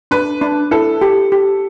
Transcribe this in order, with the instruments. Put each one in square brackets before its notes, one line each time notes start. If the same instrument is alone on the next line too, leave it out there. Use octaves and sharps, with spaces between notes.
[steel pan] D4 [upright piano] B4
[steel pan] D4
[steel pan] E4 [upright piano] A4
[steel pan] G4
G4